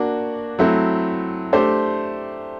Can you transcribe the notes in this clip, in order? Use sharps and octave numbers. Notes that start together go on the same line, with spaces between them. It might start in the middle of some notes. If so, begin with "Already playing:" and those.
Already playing: A#3 D4 F#4
F#3 A3 C4 E4
A3 D4 G4 C5